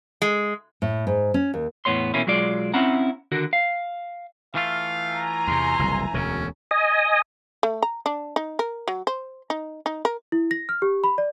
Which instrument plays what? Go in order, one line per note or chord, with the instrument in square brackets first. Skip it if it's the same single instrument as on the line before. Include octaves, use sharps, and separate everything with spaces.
[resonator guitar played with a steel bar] G#3
[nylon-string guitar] A2
G#2
C#4
D#2
[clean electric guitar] E2 A2 B3 C#5 C6
B2 E3 A#3 C#4 E4
B1 F#3 G#3 F4 D5
C4 C#4 E4 F#5 A#5
D3 D#3 F#4 A#4
F5
[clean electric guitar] E3 A3 F4 [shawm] F5
[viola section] G#5 A#5
[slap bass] E2 C3 [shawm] C6
[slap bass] F#1 C2
[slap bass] E1 D2 B2 [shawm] C#4
[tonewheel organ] D#5 G#5 D#6
[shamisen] A3
A#5
D4
D#4
A#4
F#3
C5
D#4
D#4
A#4
[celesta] E4
A#6
F6
G4
B5
D5